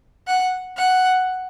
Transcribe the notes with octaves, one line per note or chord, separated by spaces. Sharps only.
F#5
F#5